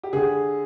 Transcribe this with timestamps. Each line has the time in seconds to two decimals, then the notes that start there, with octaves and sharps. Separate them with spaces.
0.03 G4
0.13 D3 G#4